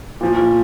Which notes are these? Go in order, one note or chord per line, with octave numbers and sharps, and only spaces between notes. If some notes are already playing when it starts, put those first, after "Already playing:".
A#2 F3